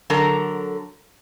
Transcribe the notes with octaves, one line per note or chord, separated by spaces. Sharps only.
D3 F#3 A4 A#4 A#5